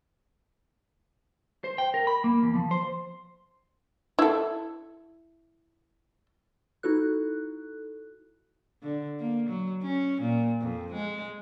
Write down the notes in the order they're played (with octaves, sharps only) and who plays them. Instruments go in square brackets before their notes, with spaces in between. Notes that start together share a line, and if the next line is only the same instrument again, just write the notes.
[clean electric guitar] C5
G5
A#4
B5
A#3
E2
F3
C5
[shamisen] E4 A4
[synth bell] D#4 E4 F#4 A4 F#6
[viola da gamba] D3
A#3
F#3
C#4
A#2
F2
G#3